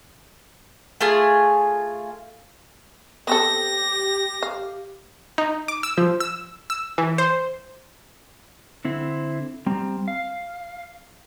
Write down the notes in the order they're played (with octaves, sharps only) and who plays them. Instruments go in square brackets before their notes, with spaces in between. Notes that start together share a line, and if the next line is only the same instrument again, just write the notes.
[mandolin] A3 F4 G#4
[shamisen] B3 C4 A4 [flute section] G4 [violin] A#6
[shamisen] F5
[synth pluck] D#4
D6
E6
F3
E6
E6
E3
C5
[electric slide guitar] D3 C4 E4
G3 C4 A#5
F5